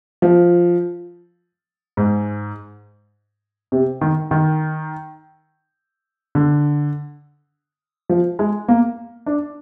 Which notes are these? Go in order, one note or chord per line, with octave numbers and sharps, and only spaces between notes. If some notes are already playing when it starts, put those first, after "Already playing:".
F3
G#2
C3
D#3
D#3
D3
F3
G#3
A#3
D4